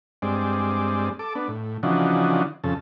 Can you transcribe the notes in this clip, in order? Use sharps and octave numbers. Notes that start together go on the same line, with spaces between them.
G2 G#3 C4 D5
A4 D6
B3 D4
A2
C#3 E3 F3 D4 D#4 F#4
F2 C#3 A4